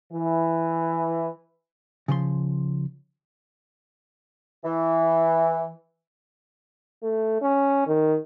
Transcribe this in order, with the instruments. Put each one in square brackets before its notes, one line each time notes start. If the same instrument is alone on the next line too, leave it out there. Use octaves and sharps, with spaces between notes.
[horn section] E3
[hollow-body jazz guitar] C#3 F3 C6
[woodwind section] E3
[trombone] A3
C#4
D#3